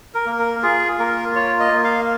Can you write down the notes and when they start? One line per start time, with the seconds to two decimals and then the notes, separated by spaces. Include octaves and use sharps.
0.14 A#4
0.26 A#3
0.39 A#4
0.63 F4 G#4
0.99 A#3 A#4
1.35 F4 C#5
1.60 D#5
1.72 A#3
1.84 F5